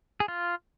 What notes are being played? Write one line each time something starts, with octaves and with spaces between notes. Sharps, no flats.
G#4
F4